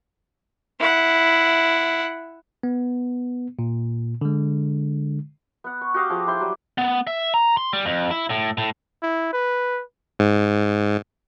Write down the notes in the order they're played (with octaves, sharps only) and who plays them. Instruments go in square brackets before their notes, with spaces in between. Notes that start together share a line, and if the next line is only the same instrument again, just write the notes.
[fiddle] E4 F#5
[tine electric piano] B3
A#2
D3 G#3
[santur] B3 F#5
C#6
F#4 G4 D#5 F5
F3 G#4 D6
E4 G4 C5 C6
F#3 G3
[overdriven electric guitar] B3
E5
A#5
C6
G3
F2
E4
A2
A2
[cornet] E4
B4
[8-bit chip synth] G#2